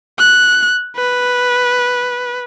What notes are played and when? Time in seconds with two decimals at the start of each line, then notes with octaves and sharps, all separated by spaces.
0.19 F#6
0.97 B4